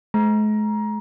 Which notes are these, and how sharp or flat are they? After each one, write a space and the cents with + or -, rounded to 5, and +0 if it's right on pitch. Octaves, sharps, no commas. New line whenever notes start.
G#3 +45 A#5 +20